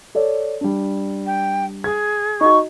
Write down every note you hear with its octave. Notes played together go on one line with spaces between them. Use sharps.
A4 C#5 D5
G3 D4
G5
G#4 G#6
D#4 F#4 C#6